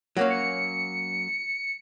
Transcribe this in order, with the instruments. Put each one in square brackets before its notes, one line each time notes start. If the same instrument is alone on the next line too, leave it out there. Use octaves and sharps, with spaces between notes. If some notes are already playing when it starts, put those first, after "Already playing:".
[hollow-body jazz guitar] F#3 A#3 C#4
[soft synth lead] C#7